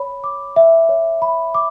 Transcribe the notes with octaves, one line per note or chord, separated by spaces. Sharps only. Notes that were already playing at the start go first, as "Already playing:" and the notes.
Already playing: C#5 B5
D6
E5
C#5
B5
D6